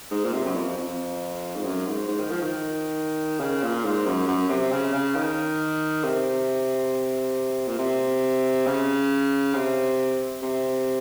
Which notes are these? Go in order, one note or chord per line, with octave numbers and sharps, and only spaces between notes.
G#2
A#2
C3
F#2
F2
F2
G#2
F#2
G#2
G#2
D#3
F3
D#3
C#3
A#2
G#2
F#2
F#2
C3
C#3
C#3
D#3
C3
A#2
C3
C#3
C3
C3